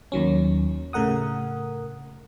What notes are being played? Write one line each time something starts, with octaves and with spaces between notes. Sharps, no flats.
D#2 D#3 F#3 C#4
A2 C#3 A3 A#4 F#5 D#6